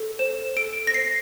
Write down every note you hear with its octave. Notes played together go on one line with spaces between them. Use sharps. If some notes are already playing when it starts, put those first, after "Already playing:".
Already playing: A4
C5 E7
A4 D7
A#6
C5 C7